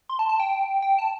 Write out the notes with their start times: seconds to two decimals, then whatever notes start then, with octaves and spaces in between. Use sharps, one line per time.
0.09 C6
0.19 A5
0.29 A5
0.40 G5
0.82 G5
0.99 A5